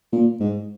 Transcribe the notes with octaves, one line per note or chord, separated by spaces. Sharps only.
A#2
G#2